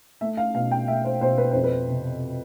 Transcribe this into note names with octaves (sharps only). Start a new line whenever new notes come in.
A3 E5
F5
B2 F5
G5
A3 E5
C5
B2 C5
B4
F2 C5
B4
C3